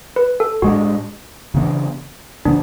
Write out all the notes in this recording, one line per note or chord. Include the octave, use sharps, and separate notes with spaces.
B4
A4
A2 G#3 D4 F#4
C#3 E3 B3 D4
C#3 E3 B3 D4